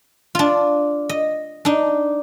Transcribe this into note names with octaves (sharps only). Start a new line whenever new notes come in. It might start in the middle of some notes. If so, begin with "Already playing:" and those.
D4 F4
D#5
D4 D#4